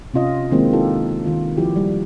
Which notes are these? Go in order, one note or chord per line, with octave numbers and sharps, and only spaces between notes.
C3 C#4 F4 D#5
D#3 G#3 A#3 C4 E4
D#4 F4 G4 A4
D#3 F4
F3 E4 F#4 G4
G3